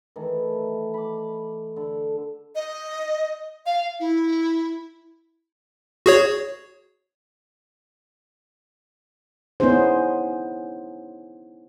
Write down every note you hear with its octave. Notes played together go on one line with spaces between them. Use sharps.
D#3 E3 A3
B5 D6
D3
D#5
F5
E4
F#4 G#4 C#5
B3 C#4 D#4 E4 G#4 C5